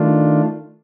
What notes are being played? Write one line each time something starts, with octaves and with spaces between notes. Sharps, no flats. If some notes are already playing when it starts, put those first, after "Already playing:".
Already playing: D#3 A3 D4 F4